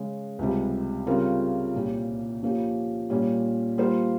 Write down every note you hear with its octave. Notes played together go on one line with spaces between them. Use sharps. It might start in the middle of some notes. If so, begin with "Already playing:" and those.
Already playing: C#3 G#3 C#4 G#4
C#2 C3 G3
C#3 G3 C4 F4 A#4
C2 A#2 G3 C#4 G4
F3 A#3 C#4 G4
A#2 G3 C#4
G3 A#3 F4 C5